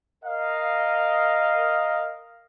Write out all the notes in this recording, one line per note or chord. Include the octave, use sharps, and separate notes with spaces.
A#4 D#5 F5